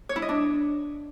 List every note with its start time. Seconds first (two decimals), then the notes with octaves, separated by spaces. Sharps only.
0.09 C#5
0.16 E4
0.22 D#5
0.29 D4